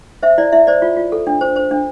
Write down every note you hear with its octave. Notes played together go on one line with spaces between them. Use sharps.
C5 E5
E4 D5
E4 E5
C5 D5
F4
F4
A4
D4
C5
C5
D4